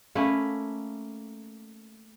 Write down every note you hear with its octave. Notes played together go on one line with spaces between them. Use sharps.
A3 A#3 C#4 B4